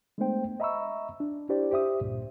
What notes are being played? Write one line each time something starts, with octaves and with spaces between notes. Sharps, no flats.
G#3 A3 B3 D4 C5 G5
D#5 E5 A#5 B5 C#6 E6
D4
D4 E4 G4 C5 D5
G4 C5 E5 D#6
C#2 G2 A#2